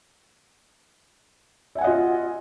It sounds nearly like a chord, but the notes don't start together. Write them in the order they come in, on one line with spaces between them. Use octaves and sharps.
E5 G#5 F#5 D#5 F4